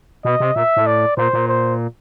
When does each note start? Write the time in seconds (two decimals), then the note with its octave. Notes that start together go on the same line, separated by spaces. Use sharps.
0.25 B2 D#5
0.40 C3
0.55 A#2 E5
0.76 A2
0.86 D5
1.17 A#2 C5
1.33 A#2
1.48 C5